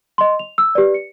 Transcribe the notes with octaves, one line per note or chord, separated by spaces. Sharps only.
D#5 C6
F7
E6
G4 B4 D5
C#7